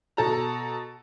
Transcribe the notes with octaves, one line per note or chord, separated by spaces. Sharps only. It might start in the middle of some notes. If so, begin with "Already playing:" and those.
B2 A4 A#5